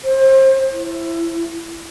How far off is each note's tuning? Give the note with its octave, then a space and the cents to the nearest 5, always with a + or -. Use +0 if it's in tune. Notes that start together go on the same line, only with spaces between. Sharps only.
C5 +30
E4 +20